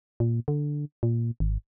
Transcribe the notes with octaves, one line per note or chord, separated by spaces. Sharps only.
A#2
D3
A#2
G#1